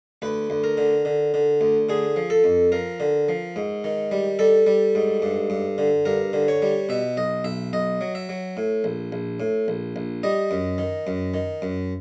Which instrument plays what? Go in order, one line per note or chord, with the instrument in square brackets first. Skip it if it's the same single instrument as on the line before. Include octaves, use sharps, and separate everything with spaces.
[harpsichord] D2 B4
D2
A#4
D3
D3
D3
D2
D3 G#4
F3
A4
F2
F3 A#4
D3
F3
G#2
D#3
G3
G3 A4
G3
G#2
G2
G2
D3
G2 A#4
D3
C#5
G3
B2 E5
B1 D#5
B1 E5
B1 D#5
F#3
E5
F#3
A2
A#1
A#1
A2
A#1
A#1
G3 D#5
F#2
D#3
F#2
D#3
F#2